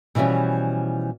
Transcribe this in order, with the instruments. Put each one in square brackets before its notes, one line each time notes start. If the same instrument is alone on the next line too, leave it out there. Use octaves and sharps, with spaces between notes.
[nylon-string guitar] B2 E3 F3 G3 C#4